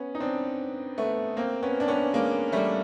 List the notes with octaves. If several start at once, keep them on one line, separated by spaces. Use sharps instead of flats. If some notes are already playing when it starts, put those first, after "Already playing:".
Already playing: B3 C#4
D#4
C4 D4
A3 B3
A#3 C4
B3 C#4
D4
B3 C#4
G#3 A#3
G3 A3